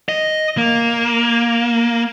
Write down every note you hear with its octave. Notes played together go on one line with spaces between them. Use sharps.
D#5
A#3